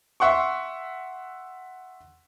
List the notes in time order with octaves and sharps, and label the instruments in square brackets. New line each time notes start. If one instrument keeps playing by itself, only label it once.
[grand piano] E5 F#5 C6 C#6